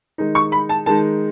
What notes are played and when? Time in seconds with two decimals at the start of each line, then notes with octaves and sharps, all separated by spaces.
0.18 D#3 G#3 D#4
0.35 C#6
0.52 B5
0.69 A5
0.86 D#3 G#3 D#4 A5